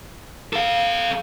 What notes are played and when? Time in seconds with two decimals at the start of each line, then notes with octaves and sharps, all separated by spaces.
0.53 A4 F5